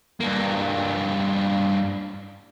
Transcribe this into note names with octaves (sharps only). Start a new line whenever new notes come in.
G2 A#3